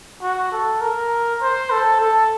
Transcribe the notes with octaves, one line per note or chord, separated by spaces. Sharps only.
F#4
A4
A#4
C5
A4
A4